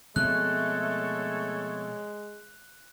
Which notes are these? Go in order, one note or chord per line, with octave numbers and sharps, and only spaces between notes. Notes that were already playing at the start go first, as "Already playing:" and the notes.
B2 F3 G#3 A3 C4 A4 C#5 F#6